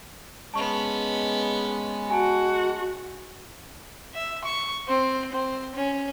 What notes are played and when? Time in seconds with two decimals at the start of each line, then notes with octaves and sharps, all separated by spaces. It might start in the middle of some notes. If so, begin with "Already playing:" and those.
0.54 G#3 B3 C#4 A5 C#6
2.10 F#4 G#5 A5
4.15 E5
4.44 C#6
4.88 C4
5.32 C4
5.75 C#4